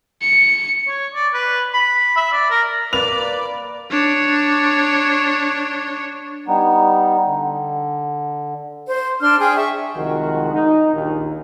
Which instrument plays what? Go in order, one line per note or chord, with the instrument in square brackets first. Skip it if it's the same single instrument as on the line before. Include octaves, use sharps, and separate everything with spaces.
[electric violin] C#7
[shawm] C#5
D5
B4
B5
E5
D5
A#4
[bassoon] A#3 [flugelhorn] B4 [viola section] D5 [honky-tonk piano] F7
[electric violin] D4 C#5
[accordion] G3 B3 D#4
D3
[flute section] C5
D4 C6 F6
G#4 G5
E5 C#6
[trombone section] C2 D#3 F3 G#3 F#4
D#4
A#1 D#2